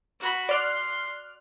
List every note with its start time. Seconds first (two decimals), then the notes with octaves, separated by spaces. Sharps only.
0.20 F#4 B5
0.49 D5 C6 F6 F#6